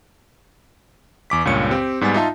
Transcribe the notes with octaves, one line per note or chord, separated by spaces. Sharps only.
E2 D6 B6
C#2 G2 A#2 C#5 C#7
C4 G4
G#2 G3 B3 G#5 A6
D#4 F4 E5 A5